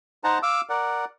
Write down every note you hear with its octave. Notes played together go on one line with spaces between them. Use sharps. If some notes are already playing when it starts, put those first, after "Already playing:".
D#4 C5 F#5 A5 A#5
F5 D6 E6
A#4 D5 F#5